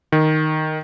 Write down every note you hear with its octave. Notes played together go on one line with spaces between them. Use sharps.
D#3